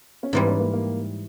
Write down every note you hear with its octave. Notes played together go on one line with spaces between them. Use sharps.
C#4
G#2 E3 G3 C4
C#4
A#3
A#3